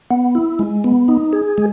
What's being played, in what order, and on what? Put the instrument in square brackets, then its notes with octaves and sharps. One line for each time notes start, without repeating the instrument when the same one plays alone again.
[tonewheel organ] B3
E4
G#3
B3
D#4
G#4
G#3